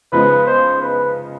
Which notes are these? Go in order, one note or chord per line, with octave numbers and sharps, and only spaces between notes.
C#3 F3 G#3 B3 D#4 B4
C5
B4